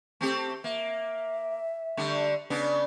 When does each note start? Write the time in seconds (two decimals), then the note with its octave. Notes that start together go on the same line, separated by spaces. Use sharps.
0.21 A3 C4 G4
0.64 A#3 E5
1.97 D3 G3 A3
2.50 C#3 B3 D4